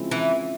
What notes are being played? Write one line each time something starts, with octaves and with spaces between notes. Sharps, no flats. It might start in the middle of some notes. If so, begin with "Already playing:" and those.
Already playing: C#3 F3 G#3 C4 E4
E3